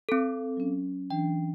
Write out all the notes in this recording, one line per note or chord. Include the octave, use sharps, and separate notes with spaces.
C4 A4
F#3 C#4
E3 D4 G5